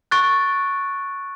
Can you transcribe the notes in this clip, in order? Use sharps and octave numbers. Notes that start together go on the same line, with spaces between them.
C#6 F#6 A6 D7